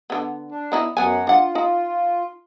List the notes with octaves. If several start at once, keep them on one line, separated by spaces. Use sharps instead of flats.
D3 B3
D4
B3 D#4 E4
F#2 F#3 B3 F#5 G#5
D4 F4 F#5
D#4